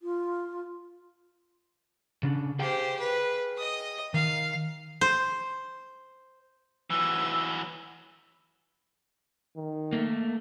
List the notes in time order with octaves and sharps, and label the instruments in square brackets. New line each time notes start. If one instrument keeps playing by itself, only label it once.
[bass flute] F4
[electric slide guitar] C#3 D4
[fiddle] G4 C5 [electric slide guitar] G#4 F5 G5
[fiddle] B4
D#5 D#6
[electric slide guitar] D#3 [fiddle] F5
[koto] C5
[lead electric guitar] E3 F#3 [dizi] E6
[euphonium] D#3
[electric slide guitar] A3 A#3